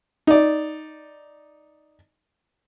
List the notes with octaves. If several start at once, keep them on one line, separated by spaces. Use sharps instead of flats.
D#4 D5